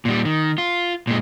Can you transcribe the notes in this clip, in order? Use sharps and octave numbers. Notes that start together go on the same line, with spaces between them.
A#2 G3
D#3
F4
A#2 G#3